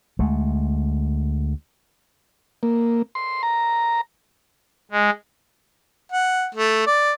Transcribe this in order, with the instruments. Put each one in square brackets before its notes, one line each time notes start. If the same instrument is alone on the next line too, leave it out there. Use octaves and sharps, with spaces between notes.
[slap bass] D2 G#3 A3
[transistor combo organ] A#3
C6
A#5
[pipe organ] G#3
[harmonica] F#5
A3
D5